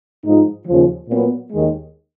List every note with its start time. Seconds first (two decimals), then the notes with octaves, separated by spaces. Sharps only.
0.24 G#2 F3 G#3 D#4
0.67 D#2 C#3 F3
1.08 A#2 F#3 B3
1.51 D#2 D#3 G#3